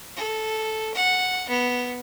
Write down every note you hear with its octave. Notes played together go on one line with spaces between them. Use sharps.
A4
F#5
B3